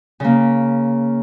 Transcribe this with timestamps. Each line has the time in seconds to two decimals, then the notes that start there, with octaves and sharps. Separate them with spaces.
0.20 C#3 A#3